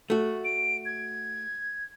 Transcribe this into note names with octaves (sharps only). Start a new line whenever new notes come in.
A3 F#4
D7
G#6